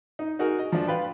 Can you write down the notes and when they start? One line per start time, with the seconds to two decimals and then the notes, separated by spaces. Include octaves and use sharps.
0.19 D#4
0.39 D#4 F#4 G#4 A#4
0.59 D#5
0.72 F3 D4
0.87 F4 B4 G5